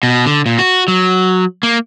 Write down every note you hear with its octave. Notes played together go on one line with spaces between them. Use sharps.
B2
D3
A#2
F#4
F#3
A#3